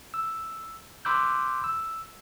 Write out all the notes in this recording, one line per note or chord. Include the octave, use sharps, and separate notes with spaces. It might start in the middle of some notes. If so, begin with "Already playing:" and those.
E6
B5 C6 D6 E6 F#6 G6
E6